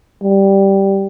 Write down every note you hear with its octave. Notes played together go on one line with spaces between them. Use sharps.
G3